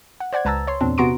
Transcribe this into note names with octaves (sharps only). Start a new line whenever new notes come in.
F#5
C5 D5 F#5 G#6
C#2 B4 A5 A#5 E6 A6
C#5 C6
E2 A#2 C4 D4
C3 B3 F#4 A#5 C6 D7